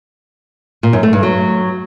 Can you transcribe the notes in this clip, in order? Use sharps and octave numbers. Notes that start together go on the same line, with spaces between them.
A#2
F#2
A3
G2
F#3